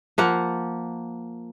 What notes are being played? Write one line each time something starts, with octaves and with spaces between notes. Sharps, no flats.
F3 A#3 F#5